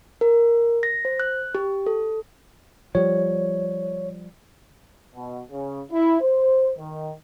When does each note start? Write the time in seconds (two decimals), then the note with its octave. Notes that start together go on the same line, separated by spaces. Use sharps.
0.21 A#4
0.83 A#6
1.05 C5
1.20 F#6
1.55 G4
1.86 A4
2.95 F3 G3 C#5
5.15 B2
5.51 C#3
5.92 E4
6.22 C5
6.78 D#3